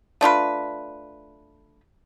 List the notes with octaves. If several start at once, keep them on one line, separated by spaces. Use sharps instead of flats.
A3 D4 F4 B4